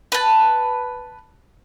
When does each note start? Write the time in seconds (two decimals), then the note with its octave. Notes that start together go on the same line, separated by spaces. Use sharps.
0.12 B4 A5